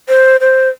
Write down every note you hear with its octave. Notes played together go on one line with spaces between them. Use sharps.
C5
C5